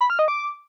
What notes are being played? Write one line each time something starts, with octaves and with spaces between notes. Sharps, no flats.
B5
F6
D#5
D6